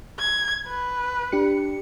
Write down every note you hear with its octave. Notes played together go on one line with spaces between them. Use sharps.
G#6
B4
D4 G4 C#7